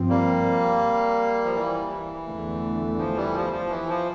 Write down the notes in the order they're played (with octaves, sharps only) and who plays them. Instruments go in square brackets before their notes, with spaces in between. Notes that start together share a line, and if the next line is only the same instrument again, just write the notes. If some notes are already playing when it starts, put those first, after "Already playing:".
Already playing: [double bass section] G2 F3 C4
[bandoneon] G3 A#3
F3
E3 G3
E3
[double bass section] E2 D3 A3
[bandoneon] F3
E3 G3
F3
F3
E3
F3